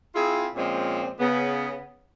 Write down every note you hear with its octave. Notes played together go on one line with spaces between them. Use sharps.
C4 E4 F4 G#4
A#2 F3 G#3 C4 C#4
C#3 B3